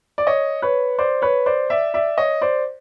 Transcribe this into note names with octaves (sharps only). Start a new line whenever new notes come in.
D5
C#5 D#5
B4 C#5
C5 D5
B4 C#5
C5 D5
D5 E5
D5 E5
C#5 D#5
C5 D5